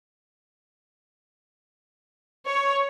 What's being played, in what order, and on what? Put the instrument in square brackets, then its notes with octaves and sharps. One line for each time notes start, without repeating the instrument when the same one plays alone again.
[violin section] C#5